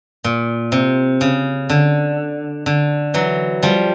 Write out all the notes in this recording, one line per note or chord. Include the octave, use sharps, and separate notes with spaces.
A#2
C3
C#3
D3
D3
E3 F#3
F3 G3